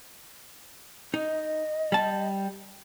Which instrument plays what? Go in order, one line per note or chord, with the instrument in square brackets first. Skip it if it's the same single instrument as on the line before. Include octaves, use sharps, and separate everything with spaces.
[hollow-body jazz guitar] D#4 [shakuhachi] D#5
[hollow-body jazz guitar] G3 A5